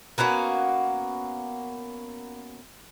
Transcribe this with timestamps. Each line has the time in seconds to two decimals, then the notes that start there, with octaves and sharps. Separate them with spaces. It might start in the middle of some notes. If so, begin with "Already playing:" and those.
0.18 A#3 B3 C#4 F#4